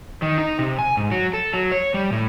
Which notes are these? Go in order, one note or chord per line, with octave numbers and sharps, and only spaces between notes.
D#3
D#4
C3
G#5
G#2
F#3
A4
F#3
C#5
G3
A2